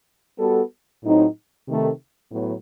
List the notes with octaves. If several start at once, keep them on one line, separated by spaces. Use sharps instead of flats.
G3 B3 F#4 A4
A2 F#3 C4 D#4
C3 D#3 A3
A2 F#3 B3